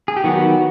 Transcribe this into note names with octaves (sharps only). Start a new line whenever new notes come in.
G#4
G4
D#3 F#3 B3 F#4